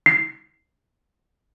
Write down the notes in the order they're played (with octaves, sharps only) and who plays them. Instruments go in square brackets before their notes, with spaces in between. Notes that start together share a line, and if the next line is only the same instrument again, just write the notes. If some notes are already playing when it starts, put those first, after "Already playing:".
[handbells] C7